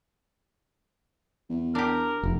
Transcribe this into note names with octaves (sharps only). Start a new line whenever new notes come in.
E2
D4 G4 A#4
F1